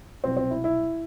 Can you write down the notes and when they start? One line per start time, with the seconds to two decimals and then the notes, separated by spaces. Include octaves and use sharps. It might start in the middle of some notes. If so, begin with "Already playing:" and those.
0.23 C2 B2 F#3 C4
0.37 C4
0.50 E4
0.64 E4